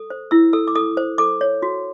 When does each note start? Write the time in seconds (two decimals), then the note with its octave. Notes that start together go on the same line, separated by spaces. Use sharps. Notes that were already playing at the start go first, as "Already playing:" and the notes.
Already playing: A4 D#6
0.10 C5
0.31 E4 E6
0.53 A4 E6
0.67 D6
0.75 A4 D#6
0.97 C5
1.18 A4 D6
1.41 C#5
1.62 F#4